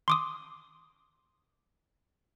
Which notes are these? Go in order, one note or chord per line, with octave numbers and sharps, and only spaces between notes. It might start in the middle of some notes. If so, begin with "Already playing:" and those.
C6 D6 D#6